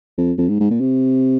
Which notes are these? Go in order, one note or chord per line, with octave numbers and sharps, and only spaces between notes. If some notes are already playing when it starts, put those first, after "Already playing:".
F2
F2
G#2
G#2
A#2
C3